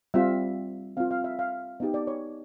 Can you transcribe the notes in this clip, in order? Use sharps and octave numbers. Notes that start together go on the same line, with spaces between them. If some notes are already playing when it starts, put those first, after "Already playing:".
G3 C4 F4 E5
C4 F4 F5
F5
E5
F5
B3 D#4 G4 D#5
D5
C#5